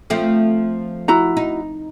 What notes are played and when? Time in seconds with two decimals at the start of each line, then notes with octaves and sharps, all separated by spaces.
0.10 F3 A3 C4
1.08 E4 F#4 A#5
1.37 D#4